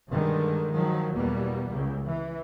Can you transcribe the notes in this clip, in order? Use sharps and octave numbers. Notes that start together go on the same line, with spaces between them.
G2 D3 D#3 G3 G#3
D#3 F3 F#3
E2 B2 G3 A#3 B3
C#2 C#3
E3